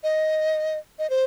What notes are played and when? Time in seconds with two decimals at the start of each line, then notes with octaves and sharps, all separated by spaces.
0.03 D#5
0.99 D#5
1.10 C5